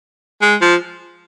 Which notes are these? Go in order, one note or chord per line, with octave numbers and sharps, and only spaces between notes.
G#3
F3